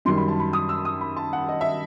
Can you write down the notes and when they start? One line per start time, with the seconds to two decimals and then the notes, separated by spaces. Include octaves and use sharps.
0.05 F#2 D#3 G3 C6
0.17 B5
0.28 A5
0.40 B5
0.53 D#6
0.69 E6
0.85 D#6
1.01 B5
1.17 A5
1.33 F#5
1.49 D#5
1.61 E5